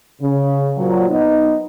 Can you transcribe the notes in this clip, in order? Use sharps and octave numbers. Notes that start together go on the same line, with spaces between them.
C#3
A#2 F3 F#3
B3 D#4